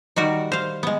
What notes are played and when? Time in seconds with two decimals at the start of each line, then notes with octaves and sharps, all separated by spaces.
0.16 D#3 G3 F#4 A#4
0.52 C5 F5
0.83 G#3 B3